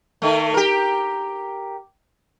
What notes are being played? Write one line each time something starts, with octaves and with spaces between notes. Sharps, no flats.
D#3 A3
G4 A#4